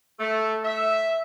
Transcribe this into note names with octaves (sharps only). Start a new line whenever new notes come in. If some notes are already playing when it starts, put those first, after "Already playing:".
A3
E5